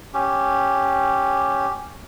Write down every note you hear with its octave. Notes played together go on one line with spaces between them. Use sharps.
C#4 G4